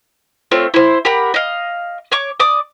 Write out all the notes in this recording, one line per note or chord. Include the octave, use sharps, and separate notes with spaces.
A3 C4 F4 C#5
E4 C5
G4 A#4 F#5 B5
D#5 F5
C#5 C#6 D6
D5 D6 D#6